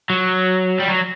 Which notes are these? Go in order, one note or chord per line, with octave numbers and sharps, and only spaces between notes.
F#3
G3
F#3